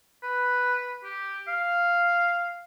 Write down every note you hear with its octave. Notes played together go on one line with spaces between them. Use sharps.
B4
G4
F5